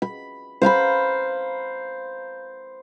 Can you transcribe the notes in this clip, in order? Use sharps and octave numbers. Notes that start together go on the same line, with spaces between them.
B5
C5 F5 A#5 B5